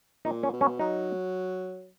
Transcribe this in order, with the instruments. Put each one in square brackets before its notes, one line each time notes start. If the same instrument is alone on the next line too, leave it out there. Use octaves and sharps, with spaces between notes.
[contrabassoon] A#2 [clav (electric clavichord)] D#4
[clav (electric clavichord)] C#4
[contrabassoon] B2
[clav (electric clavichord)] C#4
[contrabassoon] F#3 [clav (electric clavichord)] D#4